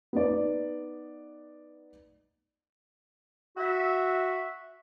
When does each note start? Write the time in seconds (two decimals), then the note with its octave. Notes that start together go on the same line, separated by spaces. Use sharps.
0.13 B3 D#4 D5
3.57 F#4 E5